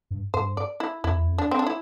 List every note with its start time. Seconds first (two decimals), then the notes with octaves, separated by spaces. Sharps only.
0.11 G2
0.34 G2 C5
0.57 D5
0.80 E4
1.04 F2 E4
1.16 E2
1.27 F2
1.38 D4
1.51 C4
1.59 D4
1.67 E4